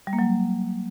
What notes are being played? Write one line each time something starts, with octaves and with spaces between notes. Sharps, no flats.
G3
A#3
F#3